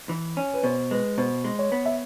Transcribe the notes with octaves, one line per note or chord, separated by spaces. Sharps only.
E3
C#4
B4
B2 C5
G#3 B4
B2 C5
G#3
C#5
B3
E5